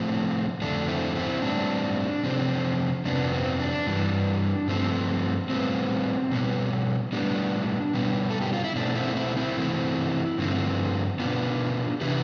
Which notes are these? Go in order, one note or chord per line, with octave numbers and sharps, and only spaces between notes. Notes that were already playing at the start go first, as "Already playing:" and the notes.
Already playing: A2 F3 A3 C4 D4 F4
F2 D3 A3 D4
C4 E4
C4 E4
A2 G3 C4 D4
C3 F3 C4
F2 C3 F3 B3 D4
C4
D4
G2 E3 G3
G2 F3 A3 C4
A2 G3 B3 C4
B2 G3 B3
A2 G3 B3 D4
B2 G3 B3
A4
G4
F4
E4
B2 A3 C4 D4
C4 E4
C4 E4
C4 E4
C3 E3 A3 C4
G2 D3 F3 A3 C4
B2 B3 D4 F4
C3 E3 B3 E4 G4